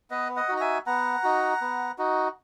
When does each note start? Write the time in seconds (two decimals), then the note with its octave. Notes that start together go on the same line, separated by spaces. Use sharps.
0.10 B3 B4 D#5
0.36 D#5 F#5
0.49 D#4 F#4
0.57 A#5
0.61 E5 G#5
0.87 B3 F#5 A#5
1.23 D#4 F#4
1.61 B3
1.98 D#4 F#4